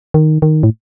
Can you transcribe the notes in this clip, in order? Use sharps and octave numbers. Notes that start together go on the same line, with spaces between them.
D#3
D#3
A2